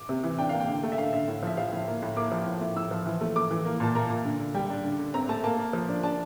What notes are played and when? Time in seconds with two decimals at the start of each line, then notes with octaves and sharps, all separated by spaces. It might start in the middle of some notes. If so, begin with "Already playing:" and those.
Already playing: D6
0.09 C3
0.23 E3
0.38 D4 G5
0.49 A#3 F5
0.60 G5
0.68 D3
0.83 A3
0.92 E5
0.98 D3 F5
1.13 D3 E5
1.28 A2
1.43 F3 E5
1.57 F3 F5
1.72 A2
1.87 A#3
2.02 A2
2.16 A#3 D6
2.32 F3
2.46 A2
2.61 A2
2.76 A2 E6
2.91 F3
3.06 E3
3.21 A3
3.36 A3 D6
3.51 E3
3.65 A#3
3.80 A#2 A5
3.95 A#3 A#5
4.10 A#2
4.25 D3
4.40 D3
4.54 G3 G5
4.69 D4
4.84 D3
4.99 D3
5.14 C4 A#5
5.29 A3 A5
5.44 A#3 A5
5.59 A#3
5.73 F3
5.88 D4
6.03 D4 A5